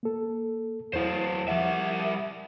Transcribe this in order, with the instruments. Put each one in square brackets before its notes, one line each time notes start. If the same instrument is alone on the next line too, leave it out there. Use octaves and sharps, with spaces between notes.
[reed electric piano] A#3 A4
[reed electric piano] E2 E4 [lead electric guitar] F#3 C5
[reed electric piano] F3 F#5 [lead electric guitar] G3 E5